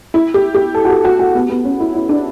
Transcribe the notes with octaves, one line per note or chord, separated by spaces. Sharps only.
E4
G4
G4
A4
F#4
G4
F#4
F#4
B3
B3
C#4
E4
E4
D4